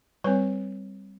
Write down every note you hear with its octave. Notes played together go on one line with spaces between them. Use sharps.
G3 C4 B4 C#5